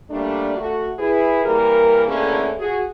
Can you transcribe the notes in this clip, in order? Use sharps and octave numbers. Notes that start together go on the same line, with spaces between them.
G3 A3 A#3 D4
A3 F#4
E4 G#4 B4
E3 G3 A#3 A#4
D3 E3 A3 A#3 C#4 G#4
F#4 G#4